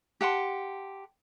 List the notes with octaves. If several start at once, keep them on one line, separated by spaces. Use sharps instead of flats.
G4 F#5 A5 C6